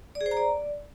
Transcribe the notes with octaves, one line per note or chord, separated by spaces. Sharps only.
D5
G#4
C5
A#5
D5